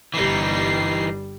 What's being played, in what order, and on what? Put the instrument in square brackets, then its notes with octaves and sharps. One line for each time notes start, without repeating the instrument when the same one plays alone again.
[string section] G1 G3 C7 [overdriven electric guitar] E3 D#4